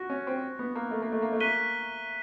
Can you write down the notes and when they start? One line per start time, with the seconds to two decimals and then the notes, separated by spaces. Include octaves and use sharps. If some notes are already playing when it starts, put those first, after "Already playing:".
Already playing: F#4 C#6 F#6 A#6
0.10 C#4
0.27 C4
0.59 B3
0.76 A#3
0.91 A3
1.02 A#3
1.12 A3
1.22 A#3
1.33 A3
1.40 A#3 F#6 B6 D#7 G7